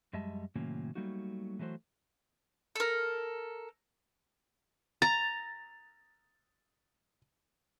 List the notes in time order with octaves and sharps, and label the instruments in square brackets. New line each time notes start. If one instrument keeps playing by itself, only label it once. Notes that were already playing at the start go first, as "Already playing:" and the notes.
[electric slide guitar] F#2 G3 G#3 D#5 E5 A5
A2 C3 D#3 F#3 A#3 C#4
F#3 G3 A3 A#3 D#4 F#4
E3 F#3 A3 F#4 C5
[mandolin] A4 A#4
[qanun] A#5 [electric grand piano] A6